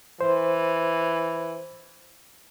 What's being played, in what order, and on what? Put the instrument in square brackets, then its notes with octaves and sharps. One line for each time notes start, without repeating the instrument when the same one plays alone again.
[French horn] E3 [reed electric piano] C5